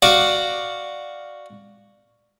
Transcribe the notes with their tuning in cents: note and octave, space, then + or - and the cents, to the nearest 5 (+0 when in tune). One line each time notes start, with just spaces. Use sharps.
F#4 +0 D5 +10 F5 +0